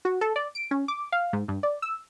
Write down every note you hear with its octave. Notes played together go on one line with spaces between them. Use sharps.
F#4
A4
D5
D7
C#4
D6
F5
G#2
G2
D5
E6